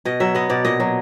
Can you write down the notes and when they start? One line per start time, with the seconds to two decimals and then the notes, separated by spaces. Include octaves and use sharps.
0.05 B2 D#5
0.20 F#3 E5
0.35 B3 D#5
0.50 B2 D5
0.65 A#2 D#5
0.80 F#3